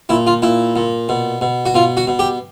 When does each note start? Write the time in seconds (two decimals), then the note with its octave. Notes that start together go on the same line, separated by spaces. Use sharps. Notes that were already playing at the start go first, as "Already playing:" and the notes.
0.09 A#2 E4
0.27 F4
0.42 A#2 E4
0.76 A#2
1.09 B2
1.41 B2
1.66 F#4
1.75 B2 F4
1.97 F#4
2.07 B2
2.19 G4